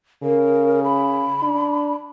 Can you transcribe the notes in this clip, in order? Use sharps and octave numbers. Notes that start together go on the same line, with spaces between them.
C#3 A#4
B5
D4